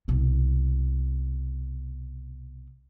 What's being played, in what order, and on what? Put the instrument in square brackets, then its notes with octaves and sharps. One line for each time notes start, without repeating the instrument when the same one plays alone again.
[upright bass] C2 B2